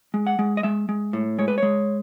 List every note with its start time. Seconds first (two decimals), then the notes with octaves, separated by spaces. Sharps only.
0.14 G#3
0.27 F#5
0.39 G#3
0.57 D#5
0.63 G#3 E5
0.89 G#3
1.13 A2
1.38 G#3 C#5
1.48 B4
1.58 G#3 C#5